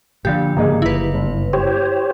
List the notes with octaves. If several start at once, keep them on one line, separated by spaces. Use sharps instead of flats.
A#2 D3 F3 G4
G#2 C#3 A#3 G#4 D#5
F#1 E4 B4
G1
G4 C5 C#5